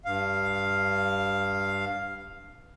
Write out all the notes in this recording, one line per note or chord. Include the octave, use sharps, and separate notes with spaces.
G2 F5